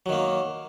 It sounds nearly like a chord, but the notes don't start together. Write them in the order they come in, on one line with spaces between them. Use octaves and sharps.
F#3 D#3 A#3